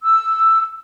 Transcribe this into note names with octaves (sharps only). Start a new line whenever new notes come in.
E6